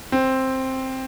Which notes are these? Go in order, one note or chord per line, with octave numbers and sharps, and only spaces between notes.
C4